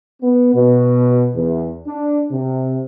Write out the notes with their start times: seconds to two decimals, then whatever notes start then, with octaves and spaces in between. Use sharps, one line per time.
0.22 B3
0.54 B2
1.35 E2
1.87 D4
2.31 C3